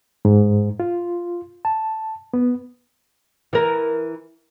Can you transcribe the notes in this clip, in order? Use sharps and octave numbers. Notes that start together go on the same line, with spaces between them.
G#2
F4
A5
B3
E3 A#4